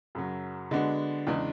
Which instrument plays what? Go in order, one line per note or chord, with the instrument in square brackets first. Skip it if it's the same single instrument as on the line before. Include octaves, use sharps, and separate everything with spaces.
[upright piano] F#2 C#3 F#3
D3 G#3 B3 D4 F#4
E2 C#3 E3 G#3 D4